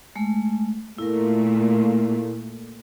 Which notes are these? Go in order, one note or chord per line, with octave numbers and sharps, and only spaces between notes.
G#3 A3
A#2 A3 E4 A#4